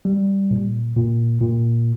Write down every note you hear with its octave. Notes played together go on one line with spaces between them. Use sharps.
G3
A#2
A#2
A#2